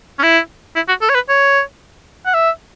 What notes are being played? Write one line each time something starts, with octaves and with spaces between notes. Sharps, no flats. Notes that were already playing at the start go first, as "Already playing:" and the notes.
C#4
E4
E4
F#4
A4
C#5
B4
C#5
F#5
E5